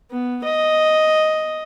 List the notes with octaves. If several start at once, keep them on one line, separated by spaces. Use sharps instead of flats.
B3
D#5